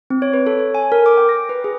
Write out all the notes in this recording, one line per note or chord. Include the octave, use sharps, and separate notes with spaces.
C4
C#5
B4
A4
C#5
G#5
A#4
D6
G5
A#6
B4
G#4